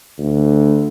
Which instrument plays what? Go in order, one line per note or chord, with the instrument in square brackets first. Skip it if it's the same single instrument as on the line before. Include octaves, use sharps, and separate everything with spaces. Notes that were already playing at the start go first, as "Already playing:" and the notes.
[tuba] D2